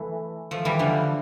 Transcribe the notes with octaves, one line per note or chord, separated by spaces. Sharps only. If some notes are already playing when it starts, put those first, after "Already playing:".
Already playing: E3 A3
F3 A3
E3 G3
D3 F3